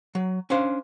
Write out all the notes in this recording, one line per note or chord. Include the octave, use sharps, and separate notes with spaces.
F#3
C#4 D4 C5 F5